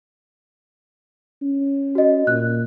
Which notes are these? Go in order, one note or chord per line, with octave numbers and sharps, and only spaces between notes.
C#4
F#4 D#5
A#2 F#6